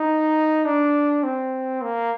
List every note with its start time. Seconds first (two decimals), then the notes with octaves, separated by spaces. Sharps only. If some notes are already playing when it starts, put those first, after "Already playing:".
Already playing: D#4
0.65 D4
1.23 C4
1.82 A#3